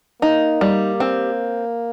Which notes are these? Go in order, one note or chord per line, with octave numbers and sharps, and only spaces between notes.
A#3 D#4
G3
C4